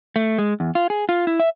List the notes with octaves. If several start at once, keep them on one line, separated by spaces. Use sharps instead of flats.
A3
G#3
E2
F4
G#4
F4
E4
E5